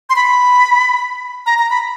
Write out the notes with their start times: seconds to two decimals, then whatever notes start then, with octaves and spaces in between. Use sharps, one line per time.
0.10 C6
0.16 B5
1.46 A#5
1.59 A#5
1.70 B5